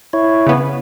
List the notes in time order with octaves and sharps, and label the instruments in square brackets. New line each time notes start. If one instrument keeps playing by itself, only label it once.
[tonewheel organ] E4 C#5
[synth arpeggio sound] C#3 B3